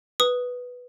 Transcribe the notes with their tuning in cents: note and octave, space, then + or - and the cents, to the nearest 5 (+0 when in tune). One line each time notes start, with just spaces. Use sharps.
B4 +0 D#6 +0